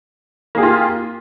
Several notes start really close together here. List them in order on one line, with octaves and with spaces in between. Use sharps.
A#3 G#4 G4 F4